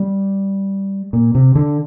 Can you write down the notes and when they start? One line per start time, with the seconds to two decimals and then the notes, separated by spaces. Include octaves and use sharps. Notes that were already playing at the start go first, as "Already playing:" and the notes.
Already playing: G3
1.13 A#2
1.35 C3
1.55 D3